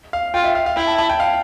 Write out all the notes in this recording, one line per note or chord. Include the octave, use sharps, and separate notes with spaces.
F5
F4 G5
E5
F5
F5
E4 G5
A5
A5
G5
F5